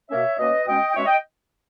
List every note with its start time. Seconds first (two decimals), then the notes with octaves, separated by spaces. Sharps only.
0.09 B2 A#3 C#4 C#5 E5
0.38 B2 A#3 C#4 B4 D#5
0.67 B2 G#3 C#4 D#5 G5
0.90 G5
0.96 B2 G#3 C#4 C#5 E5
1.05 D#5 G5